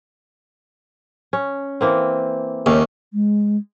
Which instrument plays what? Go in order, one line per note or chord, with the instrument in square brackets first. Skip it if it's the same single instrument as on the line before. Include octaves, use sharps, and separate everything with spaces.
[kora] C#4
E3 A#3 C4
[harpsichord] D#2 [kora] A3 C#4 F5
[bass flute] G#3